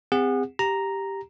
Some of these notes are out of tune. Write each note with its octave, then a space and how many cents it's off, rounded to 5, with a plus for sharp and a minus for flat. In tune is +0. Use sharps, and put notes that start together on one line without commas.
C4 -25 G#4 -40 F#5 -15
G4 +0 A#5 +0